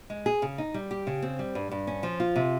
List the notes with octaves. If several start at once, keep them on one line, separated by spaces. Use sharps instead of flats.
G#3
G#4
C#3
D#4
G3
G4
C#3
C4
G3
G2
G2
C#4
F3
F4
C3